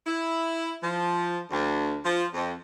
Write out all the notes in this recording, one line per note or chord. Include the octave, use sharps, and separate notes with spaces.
E4
F3
D2
F3
F2